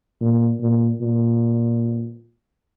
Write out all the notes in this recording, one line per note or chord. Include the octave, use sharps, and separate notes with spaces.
A#2
A#2
A#2